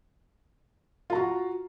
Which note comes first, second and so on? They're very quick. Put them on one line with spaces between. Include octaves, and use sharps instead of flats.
F4 A#5 F#4